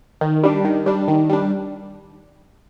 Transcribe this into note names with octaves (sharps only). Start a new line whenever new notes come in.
D#3
G3 D4
D#3
G3 D4
D#3
G3 D4